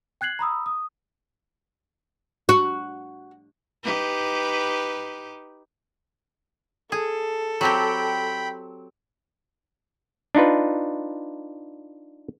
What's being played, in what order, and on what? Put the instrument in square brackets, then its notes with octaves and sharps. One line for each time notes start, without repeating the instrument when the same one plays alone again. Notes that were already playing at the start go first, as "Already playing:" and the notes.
[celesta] G5 F#6 G#6 C7 F#7
A#5 B5 D#6 E6
D#6
[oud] F#4
[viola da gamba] D#4 G4 B4
[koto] G#4 [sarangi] A4
[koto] F#3 C4 G4 [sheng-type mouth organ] G5 B5
[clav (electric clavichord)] D4 D#4 F4 B4